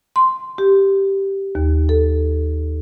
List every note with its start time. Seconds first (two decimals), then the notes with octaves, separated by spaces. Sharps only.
0.16 C6
0.58 G4
1.55 D#2
1.89 A4